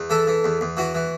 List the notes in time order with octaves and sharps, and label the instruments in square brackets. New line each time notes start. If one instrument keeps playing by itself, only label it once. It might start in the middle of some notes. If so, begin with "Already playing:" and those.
Already playing: [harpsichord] E2
E3 A4
E3
E2
E2
E3 F#4
E3